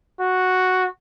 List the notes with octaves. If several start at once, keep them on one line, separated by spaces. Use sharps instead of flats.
F#4